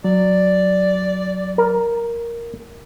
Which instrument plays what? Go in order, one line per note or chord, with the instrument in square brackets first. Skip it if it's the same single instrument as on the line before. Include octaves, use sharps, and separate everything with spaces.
[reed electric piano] F#3 [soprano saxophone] D5
[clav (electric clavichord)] A#4